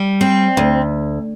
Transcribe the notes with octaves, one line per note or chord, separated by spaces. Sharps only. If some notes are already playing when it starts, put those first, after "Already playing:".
Already playing: G3
C4
D2